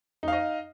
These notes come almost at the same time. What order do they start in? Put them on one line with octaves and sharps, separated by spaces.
D#4 F5 D#5